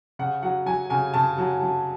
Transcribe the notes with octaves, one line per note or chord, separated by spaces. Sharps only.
C#3 F#5
F#3 F#5
F#3 G#5
C#3 G#5
C#3 A5
F#3
F#3